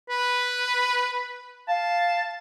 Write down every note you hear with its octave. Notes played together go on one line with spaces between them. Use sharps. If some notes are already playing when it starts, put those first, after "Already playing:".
B4
F5 A5